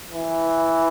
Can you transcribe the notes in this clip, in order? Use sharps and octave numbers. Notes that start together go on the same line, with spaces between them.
E3